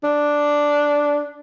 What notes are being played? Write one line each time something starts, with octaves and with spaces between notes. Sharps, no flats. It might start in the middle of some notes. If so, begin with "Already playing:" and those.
D4